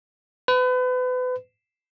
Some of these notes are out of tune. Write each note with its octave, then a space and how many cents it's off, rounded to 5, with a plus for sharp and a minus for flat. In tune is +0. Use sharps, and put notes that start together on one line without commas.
B4 +35